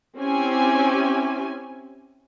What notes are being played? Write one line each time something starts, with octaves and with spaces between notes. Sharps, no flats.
C4 C#4 E4 G4 G#5